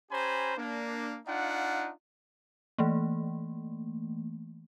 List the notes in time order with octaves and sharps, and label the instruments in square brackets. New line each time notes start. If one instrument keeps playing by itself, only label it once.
[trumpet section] C#4 G4 C5 G#5 A#5 B5
A#3 D4
D4 D#4 F4 F5 F#5
[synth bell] E3 A3 A#3